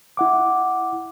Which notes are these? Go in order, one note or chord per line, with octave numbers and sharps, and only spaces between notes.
E4 F#5 D6